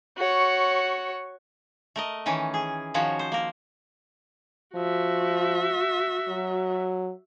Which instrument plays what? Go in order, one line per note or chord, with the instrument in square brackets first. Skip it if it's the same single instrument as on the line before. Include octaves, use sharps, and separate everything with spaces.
[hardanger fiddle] F#4 C#5
[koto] A3 A#4 D#5
D#3 E3 C#4
G#4
D#3 F3 C#4 F#4 C#5
C5
A#3 A#4
[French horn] F3 [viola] F#4 E5
[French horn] F#3